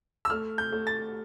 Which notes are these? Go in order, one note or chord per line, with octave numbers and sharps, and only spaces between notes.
E6
A3 F6
G6
A3
A6